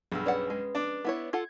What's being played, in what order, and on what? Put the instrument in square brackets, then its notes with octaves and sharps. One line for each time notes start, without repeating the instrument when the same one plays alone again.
[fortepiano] B1 G2 [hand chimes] G#4 E6
[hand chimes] C#4 B4 [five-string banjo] C#5 D5 F#5
[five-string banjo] G#3
[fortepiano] D4 D5
[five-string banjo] B3 E4 C#5
[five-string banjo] F4 A4 F#5 [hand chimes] G#6